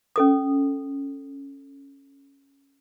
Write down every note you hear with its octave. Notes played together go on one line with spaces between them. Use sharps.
C#4 A4 D#6